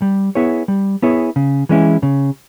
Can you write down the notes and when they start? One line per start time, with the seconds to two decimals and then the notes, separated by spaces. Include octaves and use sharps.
0.02 G3
0.35 B3 E4 G#4 C#5
0.68 G3
1.02 B3 E4 G#4 C#5
1.36 C#3
1.69 E3 G#3 C#4 E4
2.03 C#3